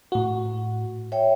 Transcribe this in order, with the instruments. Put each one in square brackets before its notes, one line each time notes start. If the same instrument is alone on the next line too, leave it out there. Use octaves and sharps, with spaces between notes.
[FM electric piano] A2 F#4
[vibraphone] C#5 E5 G5